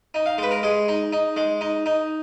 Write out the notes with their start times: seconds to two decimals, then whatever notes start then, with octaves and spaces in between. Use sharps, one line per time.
0.14 D#4
0.26 F5
0.38 G#3 B4
0.51 A#4
0.63 G#3 G#4
0.88 D#4
1.12 D#4
1.36 G#3
1.61 D#4
1.86 D#4